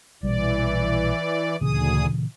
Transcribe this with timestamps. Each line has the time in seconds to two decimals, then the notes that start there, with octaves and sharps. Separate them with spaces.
0.23 A#1 B2 E3 G3 D5
1.61 D2 A#2 C#3 E3 G#4 D#6